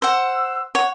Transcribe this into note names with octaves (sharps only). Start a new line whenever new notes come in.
C5 F#5 E6
C#5 F#5